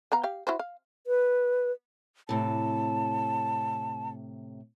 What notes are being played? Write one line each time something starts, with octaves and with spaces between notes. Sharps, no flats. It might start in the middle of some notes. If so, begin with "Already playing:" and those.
B3 F5 A#5
G4 F5
E4 F#4 C5
F5
B4
A2 C3 A5